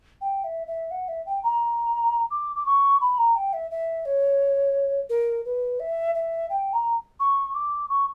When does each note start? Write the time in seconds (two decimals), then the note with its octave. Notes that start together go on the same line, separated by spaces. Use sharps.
0.21 G5
0.44 E5
0.67 E5
0.91 F#5
1.08 E5
1.26 G5
1.43 A#5
2.31 D6
2.56 D6
2.65 C#6
3.01 B5
3.18 A#5
3.35 G5
3.53 E5
3.71 E5
4.05 C#5
5.10 A#4
5.45 B4
5.80 E5
6.15 E5
6.50 G5
6.73 A#5
7.20 C#6
7.54 D6
7.89 C#6